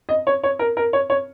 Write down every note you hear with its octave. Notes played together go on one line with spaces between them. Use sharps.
D#5
C#5
C#5
A#4
A#4
C#5
C#5